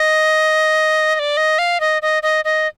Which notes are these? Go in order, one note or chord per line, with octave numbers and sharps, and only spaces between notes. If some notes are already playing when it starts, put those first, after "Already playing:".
Already playing: D#5
D#5
D5
D#5
F5
D#5
D#5
D#5
D#5